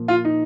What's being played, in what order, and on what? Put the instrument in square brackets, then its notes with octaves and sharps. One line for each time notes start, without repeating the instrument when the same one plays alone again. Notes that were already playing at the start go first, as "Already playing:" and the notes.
Already playing: [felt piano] A#2 F3 A#3
[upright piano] F4
D#4